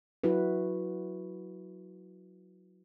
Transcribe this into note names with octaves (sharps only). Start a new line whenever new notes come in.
F#3 E4 F#4 B4